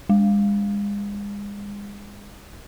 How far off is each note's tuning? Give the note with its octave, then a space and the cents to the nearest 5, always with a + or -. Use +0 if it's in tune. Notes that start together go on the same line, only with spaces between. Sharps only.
G#3 -35